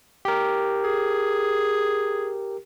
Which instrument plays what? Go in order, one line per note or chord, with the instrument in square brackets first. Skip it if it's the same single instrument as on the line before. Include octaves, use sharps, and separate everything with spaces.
[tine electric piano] G4 A#4
[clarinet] G#4